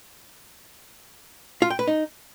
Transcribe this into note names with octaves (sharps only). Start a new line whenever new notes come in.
F4
G5
B4
D#4